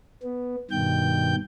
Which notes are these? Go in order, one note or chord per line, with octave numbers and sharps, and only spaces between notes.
B3
G2 B2 D#3 G5 G6